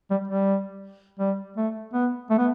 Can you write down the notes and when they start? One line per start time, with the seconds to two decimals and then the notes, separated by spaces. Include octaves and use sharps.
0.10 G3
0.28 G3
1.19 G3
1.57 A3
1.94 B3
2.30 A3
2.38 B3